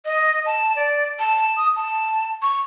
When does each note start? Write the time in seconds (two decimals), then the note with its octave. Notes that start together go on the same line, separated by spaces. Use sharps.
0.05 D#5
0.46 A5
0.76 D5
1.19 A5
1.57 D#6
1.76 A5
2.42 C#6